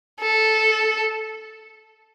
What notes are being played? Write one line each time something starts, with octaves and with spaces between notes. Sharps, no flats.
A4